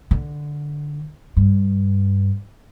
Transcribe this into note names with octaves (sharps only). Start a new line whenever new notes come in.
D3
G2